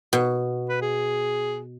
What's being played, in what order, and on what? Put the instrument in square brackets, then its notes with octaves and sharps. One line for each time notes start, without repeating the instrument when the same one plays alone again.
[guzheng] B2
[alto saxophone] B4
G#4